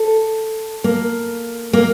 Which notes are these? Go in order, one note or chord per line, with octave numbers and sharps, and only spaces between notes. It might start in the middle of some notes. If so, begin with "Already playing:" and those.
Already playing: A4
A#3
A#3